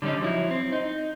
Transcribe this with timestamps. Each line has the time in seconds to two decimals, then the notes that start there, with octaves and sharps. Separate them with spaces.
0.02 D3 G3 A3 C#4 D#4
0.21 F3 F#3 E4
0.51 C4
0.72 D#4